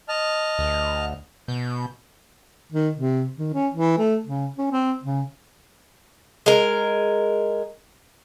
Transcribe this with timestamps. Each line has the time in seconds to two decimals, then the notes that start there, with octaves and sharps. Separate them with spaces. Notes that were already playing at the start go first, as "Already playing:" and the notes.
0.09 D#5 A5 F6
0.59 D2
1.48 B2 G6
2.72 D#3
2.97 C3
3.38 D#3
3.54 C#4
3.74 E3
3.98 A3
4.27 C#3
4.58 C#4
4.72 C4
5.04 C#3
6.46 G#3 A#4